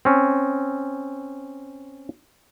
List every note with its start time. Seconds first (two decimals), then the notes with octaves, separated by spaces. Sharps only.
0.05 C4 C#4